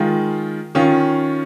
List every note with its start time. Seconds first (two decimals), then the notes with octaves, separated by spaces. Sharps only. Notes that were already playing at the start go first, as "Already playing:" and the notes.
Already playing: D#3 G#3 F4
0.75 D#3 C#4 F4